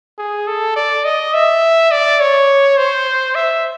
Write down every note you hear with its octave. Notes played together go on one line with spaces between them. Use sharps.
G#4
A4
D5
D#5
E5
D5
C#5
C5
E5